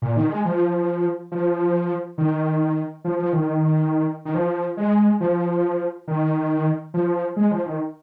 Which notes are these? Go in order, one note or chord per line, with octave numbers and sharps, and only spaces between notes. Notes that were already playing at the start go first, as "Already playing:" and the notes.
A#2
D#3
G#3
F3
F3
D#3
F3
F3
D#3
D#3
F3
G#3
F3
D#3
F3
G#3
F3
D#3